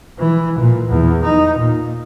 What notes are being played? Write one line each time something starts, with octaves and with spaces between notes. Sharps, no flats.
E3
A#2
E2
D#4
A#2